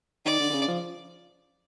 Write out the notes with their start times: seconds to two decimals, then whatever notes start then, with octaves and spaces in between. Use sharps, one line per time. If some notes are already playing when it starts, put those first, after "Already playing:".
0.25 D#3 D5
0.39 D3
0.49 D3
0.53 C#3
0.68 F3